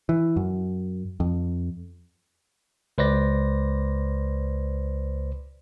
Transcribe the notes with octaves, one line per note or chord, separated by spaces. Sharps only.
E3
F#2
F2
C#2 B4 C5 D5 A#6